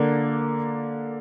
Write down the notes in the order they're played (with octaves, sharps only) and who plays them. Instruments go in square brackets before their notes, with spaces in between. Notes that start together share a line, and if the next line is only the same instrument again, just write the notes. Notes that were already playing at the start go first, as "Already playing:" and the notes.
Already playing: [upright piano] D3 A#3 D4